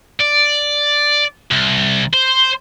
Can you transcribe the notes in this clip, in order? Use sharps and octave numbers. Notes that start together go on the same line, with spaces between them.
D5
C2
C5